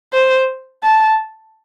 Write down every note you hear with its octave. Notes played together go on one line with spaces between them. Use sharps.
C5
A5